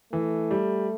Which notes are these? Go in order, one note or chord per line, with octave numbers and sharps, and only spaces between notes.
E3 A3
G3